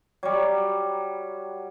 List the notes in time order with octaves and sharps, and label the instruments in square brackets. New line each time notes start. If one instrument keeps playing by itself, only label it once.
[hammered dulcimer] F#3 G3